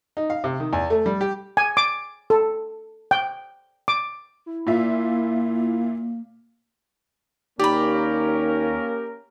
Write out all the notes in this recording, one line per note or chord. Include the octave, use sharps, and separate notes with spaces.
D#4
F5
C3
D#3
E2
A3
G3
G4
G#5
D6
A4
G5
D6
E4
A#2 A#3 F4 E5
D#2 A#3 C#4 G4 A#4 D5 B5